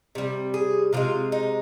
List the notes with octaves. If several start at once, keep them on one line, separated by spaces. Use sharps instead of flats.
C3 G3
G#4
C3 F3 G#3 F4
D#4